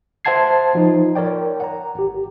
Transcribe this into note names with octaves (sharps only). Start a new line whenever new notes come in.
C5 E5 F#5 A5 G#6 C7
F3 D#4
A#4 C#5 D5 G5
F#5 A#5
G#1 G4